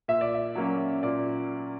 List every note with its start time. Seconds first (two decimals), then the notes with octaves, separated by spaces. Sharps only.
0.08 A#2 E5
0.21 D5
0.34 E5
0.56 F#3 A#3 C#4
1.03 A#2 D5